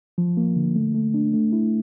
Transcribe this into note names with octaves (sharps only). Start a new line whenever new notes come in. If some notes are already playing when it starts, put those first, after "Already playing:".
F3
A#3
D3
A3
A3
D4
A3
E4